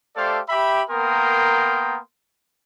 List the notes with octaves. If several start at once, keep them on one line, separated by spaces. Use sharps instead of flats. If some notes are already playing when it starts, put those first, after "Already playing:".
A3 G4 A4 C5 D5 F5
G4 E5 B5
A#3 B3 A#4 G5 C6 D#6